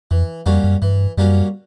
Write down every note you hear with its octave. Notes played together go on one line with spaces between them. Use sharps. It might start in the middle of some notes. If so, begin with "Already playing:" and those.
F2 E3
F2 G3 A#3 C#4 F#4
F#2
G2 E3
F#2 G3 A#3 C#4 F#4